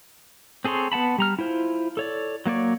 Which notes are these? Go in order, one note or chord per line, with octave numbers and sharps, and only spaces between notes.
C4 G#4 A4 C#5 C6
B3 F#5 A5 B5
G3 A#5 F6
E4 F4 C5
A4 C#5 D5
F#3 A#3 C#5 D5